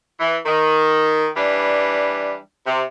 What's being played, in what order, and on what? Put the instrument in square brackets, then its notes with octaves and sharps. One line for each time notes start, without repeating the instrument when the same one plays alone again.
[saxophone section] E3
D#3
E3 G3 D4
C3